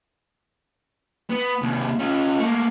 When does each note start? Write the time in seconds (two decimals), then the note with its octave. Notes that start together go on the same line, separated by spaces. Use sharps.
1.30 B3
1.62 D#2 C3
1.99 C#4 F4
2.39 A3 A#3